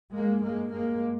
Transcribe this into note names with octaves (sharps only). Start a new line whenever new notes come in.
G2 G#3 A#3
G#3 A#3
G#3 A#3